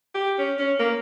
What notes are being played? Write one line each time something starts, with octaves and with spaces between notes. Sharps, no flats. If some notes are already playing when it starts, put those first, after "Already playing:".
G4
C#4
C#4
A#3